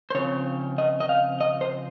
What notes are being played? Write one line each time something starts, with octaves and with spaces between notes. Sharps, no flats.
C5
C#3 F3 C4 C#5
D#5
D#5
F5
D#5
C5